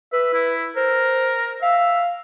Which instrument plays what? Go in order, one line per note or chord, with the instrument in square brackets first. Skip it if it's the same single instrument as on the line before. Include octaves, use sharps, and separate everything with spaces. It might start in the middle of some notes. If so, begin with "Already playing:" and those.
[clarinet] B4 [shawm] E5
[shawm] E4
[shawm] A#4 [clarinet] C5
[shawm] E5 [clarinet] F5